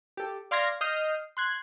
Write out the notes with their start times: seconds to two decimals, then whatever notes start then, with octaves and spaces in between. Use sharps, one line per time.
0.17 G4 A4
0.51 D5 F5 C6 F6 G#6 A#6
0.81 D#5 D#6 F6 G6 C7
1.37 C6 F#6 G#6